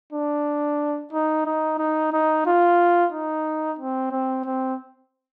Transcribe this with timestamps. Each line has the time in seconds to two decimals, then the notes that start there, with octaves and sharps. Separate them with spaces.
0.13 D4
1.13 D#4
1.46 D#4
1.78 D#4
2.13 D#4
2.46 F4
3.12 D#4
3.79 C4
4.12 C4
4.45 C4